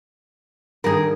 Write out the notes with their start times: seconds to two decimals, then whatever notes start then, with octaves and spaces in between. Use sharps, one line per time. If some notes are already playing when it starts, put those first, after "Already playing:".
0.84 G2 D#3 G#4 A#4